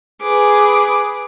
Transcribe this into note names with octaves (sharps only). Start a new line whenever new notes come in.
G#4 B4 D6